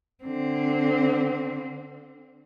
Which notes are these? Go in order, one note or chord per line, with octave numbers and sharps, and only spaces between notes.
D3 C4